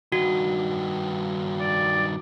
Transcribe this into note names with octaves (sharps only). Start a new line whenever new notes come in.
G2 D#3 F#4
D5